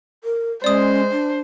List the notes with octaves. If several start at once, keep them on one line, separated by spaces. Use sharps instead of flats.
A#4
G#3 C#4 C5 D5 D#6
D4